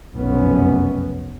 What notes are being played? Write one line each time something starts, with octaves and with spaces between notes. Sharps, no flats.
F1 B1 F#2 B3 C#4